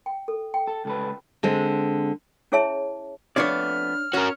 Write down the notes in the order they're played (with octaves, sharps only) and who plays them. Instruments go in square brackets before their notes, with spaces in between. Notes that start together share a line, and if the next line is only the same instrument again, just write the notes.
[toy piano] G5
A4
G5
[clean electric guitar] A4
C#2 A4 B4
[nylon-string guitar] D3 G#3 C4
[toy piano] C#4 E4 G#4 C#5 E5 A5
[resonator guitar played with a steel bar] F2 A3 B3 [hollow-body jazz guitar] D4 C#5 D5 [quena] F6
[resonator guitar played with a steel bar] C#4 C#5 [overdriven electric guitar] F#4 A#4